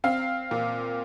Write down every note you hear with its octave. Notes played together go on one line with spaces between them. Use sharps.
C4 F5
A#2